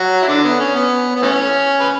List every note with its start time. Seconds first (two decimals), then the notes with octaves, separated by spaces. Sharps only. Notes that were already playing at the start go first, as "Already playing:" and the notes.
Already playing: F#3 F#4
0.22 E4
0.28 D3 D4
0.44 B3
0.59 C#4
0.75 B3
1.16 B3
1.22 E3 A3 C#4
1.80 B4